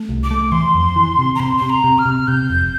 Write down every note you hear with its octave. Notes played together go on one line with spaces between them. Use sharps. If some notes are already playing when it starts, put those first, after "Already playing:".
Already playing: A3
C2
D6
A3
E3 C6
F2
E3
C3
A#5
C3 C6
C3 C6
A#5
C3
F6
C3
C3 G6
F1